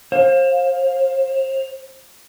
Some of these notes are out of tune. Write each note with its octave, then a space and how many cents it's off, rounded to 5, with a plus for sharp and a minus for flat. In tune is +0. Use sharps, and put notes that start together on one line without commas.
C5 +35 F5 +10